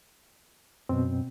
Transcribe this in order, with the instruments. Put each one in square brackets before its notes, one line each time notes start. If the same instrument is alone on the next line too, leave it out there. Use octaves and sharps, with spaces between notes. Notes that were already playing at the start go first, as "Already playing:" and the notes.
[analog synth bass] F#2 [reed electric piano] B2 C4